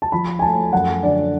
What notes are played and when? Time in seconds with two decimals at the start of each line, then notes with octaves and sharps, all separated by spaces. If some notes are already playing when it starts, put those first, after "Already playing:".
0.02 A5
0.12 F3 B5
0.39 G#5
0.42 A3 A5
0.72 F#2 F#5
1.03 D3 D5